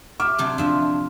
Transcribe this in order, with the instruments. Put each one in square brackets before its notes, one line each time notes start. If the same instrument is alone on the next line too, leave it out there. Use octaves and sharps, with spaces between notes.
[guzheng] E5 [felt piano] D6 F6
[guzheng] C3 F#3 D4
[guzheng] F3 E5 [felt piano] D4